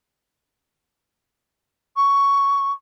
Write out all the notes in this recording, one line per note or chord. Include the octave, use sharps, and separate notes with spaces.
C#6